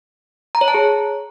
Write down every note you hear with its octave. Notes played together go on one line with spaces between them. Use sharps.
A#5
C#5
A5
G#4